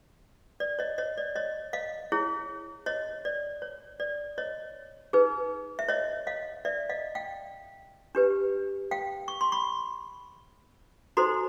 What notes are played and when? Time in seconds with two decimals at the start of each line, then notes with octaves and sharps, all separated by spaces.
0.60 D5
0.79 C#5 D#5
0.98 C#5 D#5
1.18 D5
1.36 C#5 D#5
1.73 D#5 F5
2.12 E4 G#4 C#5
2.86 C#5 D#5
3.25 D5
3.62 C#5
4.00 D5
4.38 C#5 D#5
5.13 D#4 G#4 B4
5.79 E5
5.89 C#5 D#5
6.27 D#5 F5
6.65 D5 E5
6.89 D#5 F5
7.15 F5 G5
8.15 D4 G4 B4
8.91 F5 G5
9.28 C#6
9.41 C6
9.52 B5 C#6
11.17 D#4 F#4 A4 C5 A#5 C6